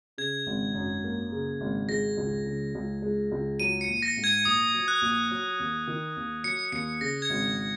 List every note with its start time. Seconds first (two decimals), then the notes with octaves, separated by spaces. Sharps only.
0.18 C#3 G#6
0.47 G#1
0.75 F#2
1.04 A#3
1.32 C#3
1.61 G#1
1.89 G#3 A#6
2.17 C#2
2.46 C#3
2.75 C#2
3.02 G#3
3.32 C#2
3.60 F#3 D#7
3.81 C#7
3.88 A#1
4.02 A#6
4.17 G#2
4.24 G#6
4.45 A#1 D#6
4.74 F#3
4.88 F#6
5.02 A#1
5.31 F#3
5.59 D#2
5.87 D#3
6.16 D#2
6.44 F#3 C#7
6.72 D#2 C#7
7.01 C#3 A#6
7.22 G#6
7.30 G#1